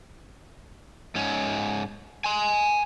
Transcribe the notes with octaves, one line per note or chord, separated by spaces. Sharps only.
G#2 C#4
G#5 C6